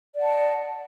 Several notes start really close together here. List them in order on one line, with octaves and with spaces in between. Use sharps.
D5 F#5 A5 D#5